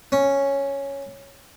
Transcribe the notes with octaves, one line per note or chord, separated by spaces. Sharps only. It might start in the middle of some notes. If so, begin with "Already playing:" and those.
C#4